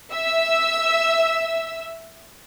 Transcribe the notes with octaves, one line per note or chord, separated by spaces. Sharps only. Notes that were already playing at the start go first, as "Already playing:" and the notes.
E5 E6